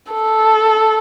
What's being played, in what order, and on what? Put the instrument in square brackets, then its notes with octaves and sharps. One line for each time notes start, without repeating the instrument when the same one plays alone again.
[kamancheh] A4